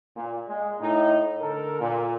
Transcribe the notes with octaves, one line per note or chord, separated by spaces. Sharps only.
A#2
G#3
A2 D#4
D3 A4 A#4
A#2